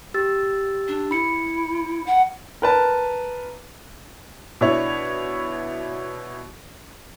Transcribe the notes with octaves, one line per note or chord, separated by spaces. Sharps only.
G4 E6 A6
D4
E4 B5 C#7
F#5
A#4 B4 A5
B2 D4 E4 C#5